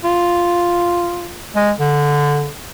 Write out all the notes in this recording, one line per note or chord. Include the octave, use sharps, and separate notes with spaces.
F4
G#3
D3